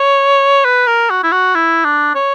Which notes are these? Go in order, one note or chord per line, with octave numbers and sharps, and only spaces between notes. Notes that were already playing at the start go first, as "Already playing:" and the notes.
Already playing: C#5
B4
A#4
F#4
E4
F#4
E4
D4
C#5